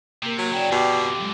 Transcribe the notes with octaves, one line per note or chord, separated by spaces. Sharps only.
C3 A#3 A#4
F#3
C#3 E4 D5 G5
F2 B2 D3 G4
F#3 G#3